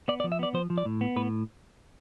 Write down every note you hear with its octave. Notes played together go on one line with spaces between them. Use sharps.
B3 D5
D5
F3
E5
B3 D5
F3 C5
F3
D5
A2
B3
A2 B4